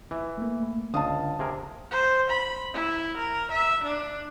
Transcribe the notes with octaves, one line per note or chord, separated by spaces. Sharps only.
E3 E5
A3 A#3
C#2 D3 D4 F5 A5 D#6
C3 G#4 A#4
C5
B5
E4
A#4
E5
D4